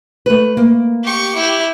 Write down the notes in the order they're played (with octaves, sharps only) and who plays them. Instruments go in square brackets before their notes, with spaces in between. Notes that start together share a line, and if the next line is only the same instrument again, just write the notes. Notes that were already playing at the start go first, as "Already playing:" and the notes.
[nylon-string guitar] A3 B4
A#3
[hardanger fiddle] G4 C#6
E4 G4